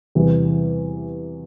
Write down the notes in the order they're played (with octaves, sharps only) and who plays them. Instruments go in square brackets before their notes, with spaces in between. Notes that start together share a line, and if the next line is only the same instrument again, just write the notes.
[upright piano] E2 C3 E3 G3